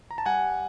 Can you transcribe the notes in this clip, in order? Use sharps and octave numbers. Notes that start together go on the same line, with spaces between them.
A#5
A5
G3 F#5 G#5